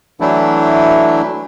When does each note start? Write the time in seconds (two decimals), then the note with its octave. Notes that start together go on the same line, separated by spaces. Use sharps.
0.20 E3 F#3 A3 D4 E4